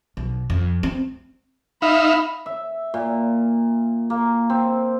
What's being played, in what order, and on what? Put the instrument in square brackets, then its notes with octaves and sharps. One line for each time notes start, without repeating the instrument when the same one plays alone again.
[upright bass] B1
F2
C4
[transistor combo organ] D#4 E5 F5 [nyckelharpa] B5
[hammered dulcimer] E5
A#2
A#3
C4